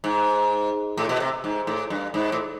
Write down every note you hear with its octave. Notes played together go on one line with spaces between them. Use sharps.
G#2
A2
B2
C3
G#2
A2
G2
G#2
A2